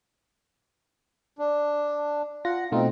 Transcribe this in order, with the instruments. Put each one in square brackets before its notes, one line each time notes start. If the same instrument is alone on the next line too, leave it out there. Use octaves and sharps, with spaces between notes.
[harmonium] D4
[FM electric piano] F4 A#6 [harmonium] F#5
[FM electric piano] B2 A3 F4 [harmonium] C4 D#4